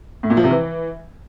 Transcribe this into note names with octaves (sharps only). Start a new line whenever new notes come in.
A2
A#2
F3
C3
E3